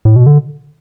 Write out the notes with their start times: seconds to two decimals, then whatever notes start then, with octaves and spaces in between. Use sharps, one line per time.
0.05 A2
0.16 B2
0.26 D3